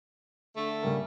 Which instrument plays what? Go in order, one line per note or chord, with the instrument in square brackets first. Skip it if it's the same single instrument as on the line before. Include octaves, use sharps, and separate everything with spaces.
[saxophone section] D3 A3
[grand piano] C#3 G3 A#3